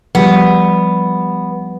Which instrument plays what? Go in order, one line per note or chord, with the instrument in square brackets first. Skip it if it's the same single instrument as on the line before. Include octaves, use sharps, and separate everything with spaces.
[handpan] F3 G3 [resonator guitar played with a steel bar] B3